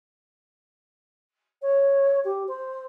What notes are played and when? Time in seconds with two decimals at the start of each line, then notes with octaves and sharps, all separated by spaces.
1.62 C#5
2.24 G4
2.48 C5